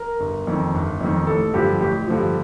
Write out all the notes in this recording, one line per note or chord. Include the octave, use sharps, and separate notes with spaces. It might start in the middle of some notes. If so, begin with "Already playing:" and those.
Already playing: A#4
G1
F2 D#3
G1
F2 D#3
A1 A4
G2 D3 F3 G4
A1 G4
G2 D3 F3